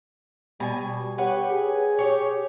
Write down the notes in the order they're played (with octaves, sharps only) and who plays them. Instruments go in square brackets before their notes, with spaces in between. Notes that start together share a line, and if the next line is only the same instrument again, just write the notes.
[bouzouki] B2 G#5 [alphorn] G3
[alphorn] G4 [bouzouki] B4 C#5 F#5
[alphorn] G#4
[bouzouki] G4 C#5